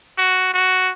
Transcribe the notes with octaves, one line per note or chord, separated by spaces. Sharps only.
F#4
F#4